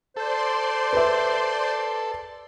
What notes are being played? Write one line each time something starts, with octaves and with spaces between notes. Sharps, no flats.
A4 C5 D5 C6
B4 E5